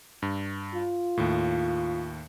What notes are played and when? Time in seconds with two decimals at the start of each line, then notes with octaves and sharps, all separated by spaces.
0.22 G2
0.75 F4
1.17 D#2 A2